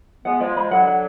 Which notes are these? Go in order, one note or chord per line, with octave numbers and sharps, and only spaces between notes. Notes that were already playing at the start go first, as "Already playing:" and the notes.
G#3 B3 F#5
F3 G#3 D5
F3 G#3 B5
D3 F#3 F#5
F#5